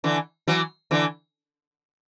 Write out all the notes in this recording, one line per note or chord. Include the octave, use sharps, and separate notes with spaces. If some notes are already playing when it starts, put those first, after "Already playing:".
D3 E3
E3 F#3
D3 E3